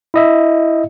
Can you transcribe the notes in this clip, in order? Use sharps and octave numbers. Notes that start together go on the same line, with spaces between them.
E4 D#5 E5